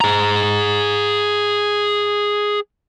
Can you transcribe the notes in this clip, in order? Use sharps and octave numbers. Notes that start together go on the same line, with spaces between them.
G#4 A#5